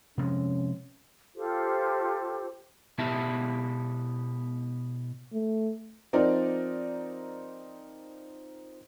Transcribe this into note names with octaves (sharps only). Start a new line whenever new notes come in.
C3 F3 G#3 C#4
F4 G4 A4 C5
B2 B3 E4 G4 E5 A5
A3
F3 C4 D#4 A#4 D5